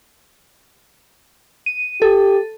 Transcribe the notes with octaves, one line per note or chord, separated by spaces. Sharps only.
D#7
G4 A4